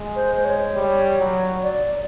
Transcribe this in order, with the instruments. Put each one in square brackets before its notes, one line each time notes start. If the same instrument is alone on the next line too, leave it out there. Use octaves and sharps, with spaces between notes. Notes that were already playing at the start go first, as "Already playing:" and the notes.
Already playing: [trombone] G#3
[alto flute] C5
C5
C#5
[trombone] G3
F#3
[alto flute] D5